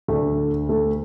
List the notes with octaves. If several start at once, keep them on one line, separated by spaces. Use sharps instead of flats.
D2 D3 A3
A3